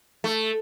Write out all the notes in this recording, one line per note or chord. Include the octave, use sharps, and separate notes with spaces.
A3